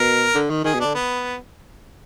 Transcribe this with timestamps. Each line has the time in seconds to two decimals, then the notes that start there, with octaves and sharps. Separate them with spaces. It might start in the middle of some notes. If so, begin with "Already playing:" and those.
Already playing: B2 A#4
0.35 D3
0.50 D#3
0.64 D#3 G#4
0.74 B2
0.80 D4
0.85 D3
0.95 B3